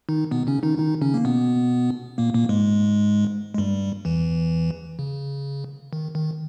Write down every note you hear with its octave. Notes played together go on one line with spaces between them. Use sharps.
D#3 D#4
B2 B3
C#3 C#4
D#3 D#4
D#3 D#4
C#3 C#4
A#3
B2 B3
A#2 A#3
A#2 A#3
G#2 G#3
G#3
G2 G3
E2 E3
C#3
D#3
D#3